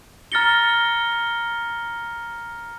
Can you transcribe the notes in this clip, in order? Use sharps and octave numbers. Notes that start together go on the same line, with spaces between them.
A#5 F6 A6 A#6 C#7 G7